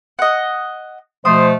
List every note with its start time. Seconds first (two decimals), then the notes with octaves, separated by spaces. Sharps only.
0.19 D#5 F#5
1.25 B2 F3 A3 C5 D#6